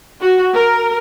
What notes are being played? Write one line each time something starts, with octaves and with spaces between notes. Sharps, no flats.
F#4
A#4